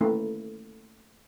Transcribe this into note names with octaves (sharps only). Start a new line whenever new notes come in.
A3 A#3 C#4 E4